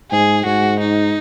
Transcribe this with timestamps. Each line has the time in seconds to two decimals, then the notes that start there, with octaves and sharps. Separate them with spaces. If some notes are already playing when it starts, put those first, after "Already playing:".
0.12 G#2 G#4
0.46 G#2 F#4
0.80 D#4